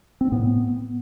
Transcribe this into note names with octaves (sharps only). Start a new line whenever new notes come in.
C4
A2 B3